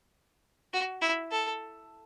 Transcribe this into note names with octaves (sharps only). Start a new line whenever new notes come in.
F#4
E4
A4